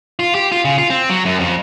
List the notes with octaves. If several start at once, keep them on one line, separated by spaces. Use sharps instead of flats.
F4
G4
F4
C#3
F4
C4
F#3
F#2
F2